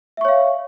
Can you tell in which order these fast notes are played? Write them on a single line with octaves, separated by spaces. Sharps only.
E5 C#6 C#5 F5